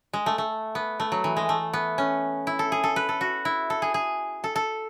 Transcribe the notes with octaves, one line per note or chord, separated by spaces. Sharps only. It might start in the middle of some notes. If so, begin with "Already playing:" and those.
G#3
A3
A3
B3
A3
F#3
E3
G#3
A3
B3
C#4
E4
A4
G#4
A4
B4
A4
F#4
E4
A4
G#4
G#4
A4
A4